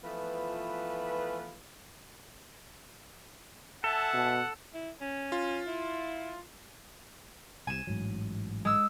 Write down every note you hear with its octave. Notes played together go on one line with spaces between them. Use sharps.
E3 F3 A3 B3 F4 B4
A4 E5 F#5 G#5 A5
B2
E4
C#4
F4
E4
C2 C3 G#5 E7
A1 G#2 F#3
G#3 E6